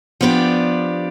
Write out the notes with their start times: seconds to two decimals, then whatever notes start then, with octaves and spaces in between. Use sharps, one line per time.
0.21 F3 B3 D4 G4 D5